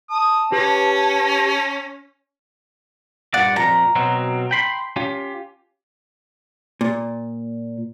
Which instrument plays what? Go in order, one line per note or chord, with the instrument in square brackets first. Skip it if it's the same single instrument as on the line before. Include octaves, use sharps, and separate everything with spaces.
[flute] A5 [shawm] D#6
[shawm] C#4 [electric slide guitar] G4 B4
[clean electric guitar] G2 A#2 D5 [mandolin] F#5
[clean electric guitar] F2 A#2 [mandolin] A#5
[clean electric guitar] B2 F#3 C4
G5 B5 C6
C#4 F4 G4
[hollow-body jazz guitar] A#2